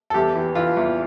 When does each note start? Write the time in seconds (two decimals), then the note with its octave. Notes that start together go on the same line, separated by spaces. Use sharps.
0.10 A4
0.14 E2 G4
0.35 E3
0.55 E3 F4
0.77 E2